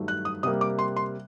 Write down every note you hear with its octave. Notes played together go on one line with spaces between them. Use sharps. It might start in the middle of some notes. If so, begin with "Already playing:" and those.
Already playing: G2 D#3 F#3 A3
F#6
D#6
C3 G3 A#3 D#6
D6
C6
C6